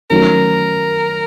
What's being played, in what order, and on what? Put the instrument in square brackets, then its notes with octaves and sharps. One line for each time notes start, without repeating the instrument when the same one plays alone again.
[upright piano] D#3 F#3 A3 C#4 [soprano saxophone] A#4